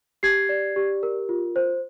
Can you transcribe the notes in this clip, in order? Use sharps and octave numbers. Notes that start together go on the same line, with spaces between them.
G4 G#6 C7
D5
G4
A#4
F4
C5